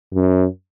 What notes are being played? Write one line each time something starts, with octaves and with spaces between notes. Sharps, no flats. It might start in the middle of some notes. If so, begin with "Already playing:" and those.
F#2